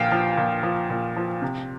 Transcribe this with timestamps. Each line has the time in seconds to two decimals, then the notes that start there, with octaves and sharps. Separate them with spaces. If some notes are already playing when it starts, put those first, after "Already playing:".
Already playing: A#2 F3 F5 G5
0.12 F3
0.37 A#2
0.63 F3
0.90 A#2
1.16 F3
1.42 C3